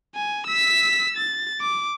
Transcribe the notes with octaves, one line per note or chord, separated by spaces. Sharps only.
G#5
E6 B6
A6
D6